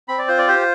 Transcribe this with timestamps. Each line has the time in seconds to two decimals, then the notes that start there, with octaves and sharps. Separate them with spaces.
0.08 C4 B5
0.18 D5
0.28 F4 C5
0.38 D5
0.48 G4 C5